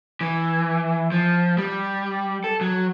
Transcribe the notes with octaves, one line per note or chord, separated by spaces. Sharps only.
E3
F3
G3
A4
F#3